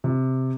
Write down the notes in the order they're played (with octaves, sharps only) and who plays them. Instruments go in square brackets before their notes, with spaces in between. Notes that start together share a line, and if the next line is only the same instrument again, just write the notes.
[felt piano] C3